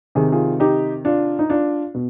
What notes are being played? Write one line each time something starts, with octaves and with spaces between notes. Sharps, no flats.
C3 D#3 G#4
F4 G#4
D#4 G4
D4 F4
D#4
D4 F4
B2